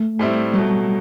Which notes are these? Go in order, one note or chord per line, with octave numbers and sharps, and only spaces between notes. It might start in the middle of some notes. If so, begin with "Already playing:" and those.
Already playing: A3
A2 G3 C4 E4
B2 F#3 G3 A3